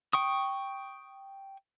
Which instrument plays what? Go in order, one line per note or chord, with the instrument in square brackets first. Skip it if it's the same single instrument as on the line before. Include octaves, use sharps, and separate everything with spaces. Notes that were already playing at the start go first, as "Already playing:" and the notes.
[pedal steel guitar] G5 C#6 D#6